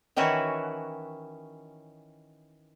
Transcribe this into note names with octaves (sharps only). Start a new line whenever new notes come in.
D#3 E3 C#4 E4 F#4